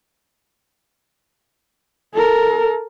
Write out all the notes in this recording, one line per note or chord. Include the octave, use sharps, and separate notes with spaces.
A4 A#4